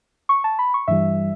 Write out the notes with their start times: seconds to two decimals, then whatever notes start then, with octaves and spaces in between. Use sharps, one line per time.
0.29 C#6
0.44 A5
0.59 B5
0.74 C#6
0.88 G2 E3 G3 E5